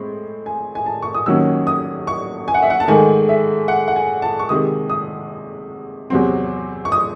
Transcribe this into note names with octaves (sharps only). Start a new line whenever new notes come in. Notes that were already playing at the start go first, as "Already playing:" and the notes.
Already playing: A2 G#3 C4
G#5
G#5
A5
C#6
D#6
D#2 D#3 F#3 C#4 E6
D#6
C#6
G#5
F#5
E5
F#5
A5
G#2 D#3 A3 G#5
E5
F#5
F#5
G#5
A5
C#6
C3 D#3 G#3 D#6
D#6
E2 C3 F#3 C4
C#6
D#6